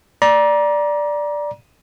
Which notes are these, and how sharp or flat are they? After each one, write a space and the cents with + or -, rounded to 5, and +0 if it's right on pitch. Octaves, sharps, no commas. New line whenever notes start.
D5 +0 A#5 +30